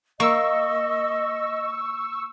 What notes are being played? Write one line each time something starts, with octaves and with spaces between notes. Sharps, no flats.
A#3 D#5 C#6 E6